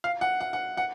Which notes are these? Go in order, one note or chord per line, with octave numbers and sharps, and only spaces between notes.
F5
F#5
F#5
F#5
F#5